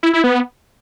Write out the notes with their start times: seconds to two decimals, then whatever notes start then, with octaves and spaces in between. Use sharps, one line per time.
0.03 E4
0.13 E4
0.24 B3